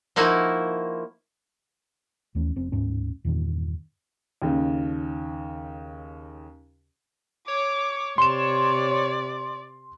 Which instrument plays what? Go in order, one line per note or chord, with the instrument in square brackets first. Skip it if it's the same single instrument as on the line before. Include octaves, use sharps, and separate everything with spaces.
[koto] F3 A#3 D#4 E4 F#4
[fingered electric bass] D#2 E3 A3 C#4
F1 C4
D1 G#2 C#4
E2 G2 A#2 D#3
[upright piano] D#2 C#3
[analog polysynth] C#5 [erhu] D6
[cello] C3 [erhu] D5 [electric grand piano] C6 E7